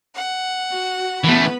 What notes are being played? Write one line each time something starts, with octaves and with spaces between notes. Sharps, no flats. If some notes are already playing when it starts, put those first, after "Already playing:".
F#5
F#4
E3 A3 B3 B4 B5